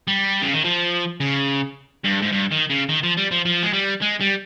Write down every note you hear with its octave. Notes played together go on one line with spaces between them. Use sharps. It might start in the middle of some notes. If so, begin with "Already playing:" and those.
G3
C#3
D#3
F3
C#3
G2
G#2
G2
D#3
C#3
D#3
F3
G3
F3
F3
G#3
G3
G#3
G3